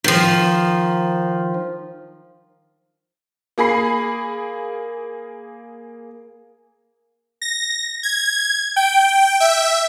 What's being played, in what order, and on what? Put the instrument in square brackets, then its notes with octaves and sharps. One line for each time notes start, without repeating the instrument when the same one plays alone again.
[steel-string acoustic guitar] D#3 F3
[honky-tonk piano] A#3 G#4 B5 C7
[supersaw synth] A#6
G#6
G5
E5